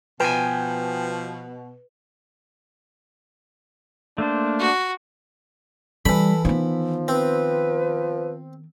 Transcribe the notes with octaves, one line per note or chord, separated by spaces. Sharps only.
B2 F3 B4 G5 G#5
A3 A#3 D4 C5
F#4
E3 G3 A4 B5
D#3 F3 B3
C4 B4